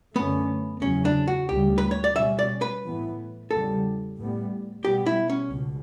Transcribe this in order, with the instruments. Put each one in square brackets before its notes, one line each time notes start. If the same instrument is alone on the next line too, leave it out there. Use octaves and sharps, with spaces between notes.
[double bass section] F#2 D3 A3 C#4 [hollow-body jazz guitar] B3
[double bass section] E2 C#3 F#3 [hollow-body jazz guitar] C#4
[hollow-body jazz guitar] D4
F#4
[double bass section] D2 C#3 G3 [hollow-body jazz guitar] G4
[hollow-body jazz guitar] B4
C#5
D5
[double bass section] B2 G3 C#4 [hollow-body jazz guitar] E5
[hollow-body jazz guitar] D5
B4
[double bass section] A2 E3 B3
[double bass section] E2 C#3 G3 B3 [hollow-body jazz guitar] A4
[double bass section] A2 G3 B3
[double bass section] B2 G3 B3 [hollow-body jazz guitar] G4
[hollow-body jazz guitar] E4
C#4
[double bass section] C#2 B2